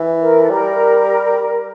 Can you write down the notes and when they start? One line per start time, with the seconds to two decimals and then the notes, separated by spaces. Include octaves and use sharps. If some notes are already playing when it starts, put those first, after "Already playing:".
Already playing: E3
0.20 A#4
0.42 A4
0.50 G3 A#4